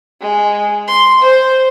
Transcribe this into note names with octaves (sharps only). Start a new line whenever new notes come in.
G#3
C6
C5